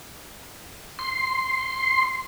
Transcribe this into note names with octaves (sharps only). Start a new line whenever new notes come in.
C6